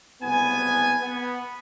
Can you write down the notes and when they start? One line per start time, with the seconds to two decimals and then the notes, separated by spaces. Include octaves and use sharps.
0.22 F#1 C2 B3 G#5
1.01 B3